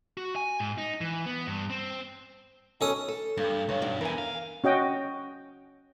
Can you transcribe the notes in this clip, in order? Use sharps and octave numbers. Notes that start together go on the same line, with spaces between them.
F#4
G#5
G#2
D#4
E3
B3
G2
C4
B1 C#4 A4 D#6
A4
G2 A#3
C#2 G2 C#5
B2 D#3 D4
E2 E3 A#4 G#5
F5
C#4 F#4 D#5 G5